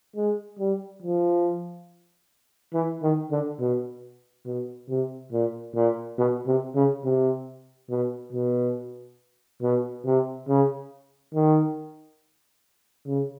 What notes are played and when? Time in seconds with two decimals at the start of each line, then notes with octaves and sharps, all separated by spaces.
0.16 G#3
0.59 G3
1.02 F3
2.74 E3
3.03 D#3
3.31 D3
3.60 B2
4.46 B2
4.89 C3
5.32 A#2
5.76 A#2
6.18 B2
6.47 C3
6.75 C#3
7.04 C3
7.90 B2
8.33 B2
9.62 B2
10.05 C3
10.48 C#3
11.34 D#3
13.06 C#3